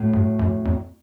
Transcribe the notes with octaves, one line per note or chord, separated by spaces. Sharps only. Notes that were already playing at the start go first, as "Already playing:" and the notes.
Already playing: A2 F#3 A3
G2
F#2
F2